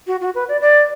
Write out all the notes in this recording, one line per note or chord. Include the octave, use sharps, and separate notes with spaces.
F#4
F#4
B4
D5
D5